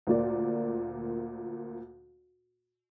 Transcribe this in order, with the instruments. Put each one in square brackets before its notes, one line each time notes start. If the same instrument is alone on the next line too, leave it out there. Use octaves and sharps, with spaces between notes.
[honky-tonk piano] D2 A#2 A#3 D5